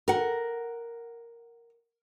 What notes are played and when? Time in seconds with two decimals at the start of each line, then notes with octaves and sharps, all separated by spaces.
0.08 A#4 F#5